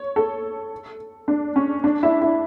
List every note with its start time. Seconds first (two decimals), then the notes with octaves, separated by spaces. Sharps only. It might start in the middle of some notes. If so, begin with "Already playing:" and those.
Already playing: C#5
0.16 A4
1.28 D4
1.56 C#4
1.84 D4
2.03 E4
2.21 E4